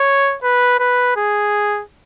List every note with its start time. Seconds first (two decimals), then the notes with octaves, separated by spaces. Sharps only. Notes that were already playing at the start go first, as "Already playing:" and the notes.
Already playing: C#5
0.43 B4
0.79 B4
1.16 G#4